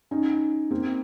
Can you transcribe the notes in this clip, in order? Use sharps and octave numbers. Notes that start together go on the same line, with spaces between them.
C#4 D#4
A#3 C4